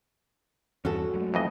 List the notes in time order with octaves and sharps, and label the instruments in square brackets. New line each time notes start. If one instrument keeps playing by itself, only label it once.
[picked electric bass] E2 G2 E3 [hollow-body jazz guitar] C#4 F#4 A4
[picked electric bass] F#3 G#3 A3
[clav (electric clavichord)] F2 E3 D#5